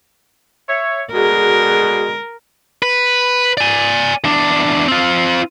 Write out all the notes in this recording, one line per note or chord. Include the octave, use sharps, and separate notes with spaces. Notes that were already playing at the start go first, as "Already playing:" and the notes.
C#5 E5
B2 D3 G#3 F#4 G#4 A#4
B4
D5 G#5
E2 D4
C4 F4